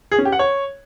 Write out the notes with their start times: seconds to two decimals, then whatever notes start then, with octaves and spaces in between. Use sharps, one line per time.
0.12 G#4
0.18 C#4
0.25 G4
0.32 F#5
0.39 C#5